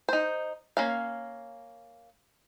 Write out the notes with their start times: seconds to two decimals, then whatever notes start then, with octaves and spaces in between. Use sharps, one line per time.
0.09 D#4 C5
0.77 A#3 C#4 F5